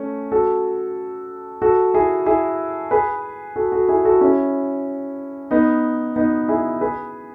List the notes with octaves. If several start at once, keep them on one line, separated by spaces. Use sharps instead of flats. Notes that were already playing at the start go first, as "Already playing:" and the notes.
Already playing: A3 C#4
F#4 A4
F#4 A4
E4 G#4
E4 G#4
G#4 B4
F#4 A4
F#4 A4
E4 G#4
F#4 A4
C#4 E4
B3 D#4
B3 D#4
E4 G#4
G#4 B4